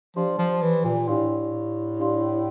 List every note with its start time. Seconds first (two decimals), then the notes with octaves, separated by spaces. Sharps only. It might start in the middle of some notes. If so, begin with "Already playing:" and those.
0.16 F3 D4 G4 D5 F5 C6
0.39 F3
0.62 E3
0.85 A#2
1.08 A2 D4 G4 D5 F5 C6
1.99 D4 G4 D5 F5 C6